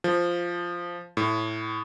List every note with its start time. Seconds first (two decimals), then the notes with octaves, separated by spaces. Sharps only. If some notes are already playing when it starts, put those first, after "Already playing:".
0.04 F3
1.17 A2